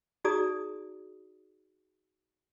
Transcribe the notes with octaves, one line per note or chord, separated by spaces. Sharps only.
D#4 F#4 G#4 D5 A#5 D#6